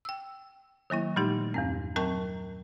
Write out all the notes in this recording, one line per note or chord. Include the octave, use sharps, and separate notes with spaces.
G5 E6
D#3 F#3 A#3 E4
A#2 F3 G3 A3 D#4 G4
E2 G2 C4
F#3 C4 A#4 G5 A5 C#6